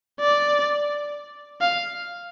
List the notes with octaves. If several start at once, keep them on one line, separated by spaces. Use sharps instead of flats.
D5
F5